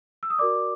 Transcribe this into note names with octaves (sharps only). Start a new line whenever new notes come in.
E6
D#6
F#4 A#4 D5 D6